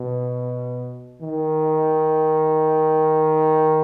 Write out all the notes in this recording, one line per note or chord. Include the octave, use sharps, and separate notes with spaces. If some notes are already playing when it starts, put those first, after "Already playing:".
Already playing: B2
D#3